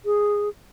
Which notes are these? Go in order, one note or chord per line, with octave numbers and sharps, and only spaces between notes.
G#4